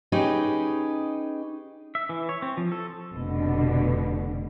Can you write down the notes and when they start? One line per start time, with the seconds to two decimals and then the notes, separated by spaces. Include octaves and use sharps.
0.12 C#4 D#4 G4 G#4 B4
1.95 E5
2.09 E3
2.29 C#5
2.42 C4
2.57 F3
2.72 A4
3.14 F1 B2 D3